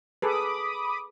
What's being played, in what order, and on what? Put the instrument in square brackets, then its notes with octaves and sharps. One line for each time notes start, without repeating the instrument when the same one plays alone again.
[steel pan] G#4 A4 B4 [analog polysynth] B5 D6 D#6